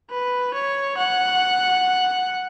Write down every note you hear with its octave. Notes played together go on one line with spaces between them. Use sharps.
B4
C#5
F#5